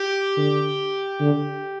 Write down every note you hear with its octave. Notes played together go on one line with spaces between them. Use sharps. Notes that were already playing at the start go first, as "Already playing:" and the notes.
Already playing: G4
D3
D3